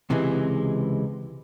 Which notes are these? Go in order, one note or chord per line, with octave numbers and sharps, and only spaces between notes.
C#2 C3 E3 G#3